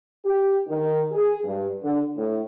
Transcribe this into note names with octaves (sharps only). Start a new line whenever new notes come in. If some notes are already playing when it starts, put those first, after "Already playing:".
G4
D#3
G#4
G2
D3
A2